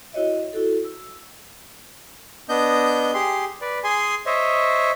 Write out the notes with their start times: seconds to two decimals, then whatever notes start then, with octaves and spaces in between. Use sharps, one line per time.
0.13 E4 F#4 C#5 D#5 E5
0.53 E4 F#4 A4
0.84 E6
2.49 B3 D4 D#5 G6
3.14 G4 G#4 C6
3.61 B4 D5
3.84 G#4 G#5 C6
4.26 C5 C#5 D#5 E5